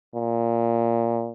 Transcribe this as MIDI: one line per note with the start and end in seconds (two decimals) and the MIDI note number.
0.15 1.32 46